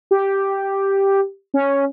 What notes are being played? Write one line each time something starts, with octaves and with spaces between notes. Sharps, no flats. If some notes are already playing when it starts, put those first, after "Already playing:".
G4
C#4